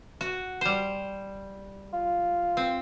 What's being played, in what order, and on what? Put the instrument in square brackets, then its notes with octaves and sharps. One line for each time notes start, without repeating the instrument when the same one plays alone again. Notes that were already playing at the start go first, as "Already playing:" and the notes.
[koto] F#4
G3 C5
[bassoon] F4
[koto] C4